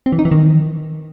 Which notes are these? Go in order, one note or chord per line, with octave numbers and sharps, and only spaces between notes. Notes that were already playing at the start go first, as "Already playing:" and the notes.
C4
E3
D#4
E3
D#3